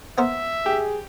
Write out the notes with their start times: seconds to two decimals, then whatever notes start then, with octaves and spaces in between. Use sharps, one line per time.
0.18 B3 A#4 C5 E5
0.66 G4 G#4